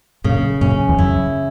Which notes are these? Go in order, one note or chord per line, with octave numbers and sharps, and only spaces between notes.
F#2 A#2 C#3
F#2 A#2 C#4
E2
F#2 E4